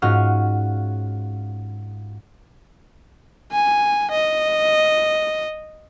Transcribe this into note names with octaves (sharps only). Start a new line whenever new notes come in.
G#2 C#4 F4 F#4 F6
G#5
D#5